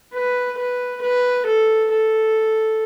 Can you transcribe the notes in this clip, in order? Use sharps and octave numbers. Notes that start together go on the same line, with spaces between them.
B4
B4
B4
A4
A4